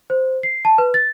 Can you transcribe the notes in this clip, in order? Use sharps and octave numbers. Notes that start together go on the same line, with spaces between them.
C5
C7
A5
B4
A6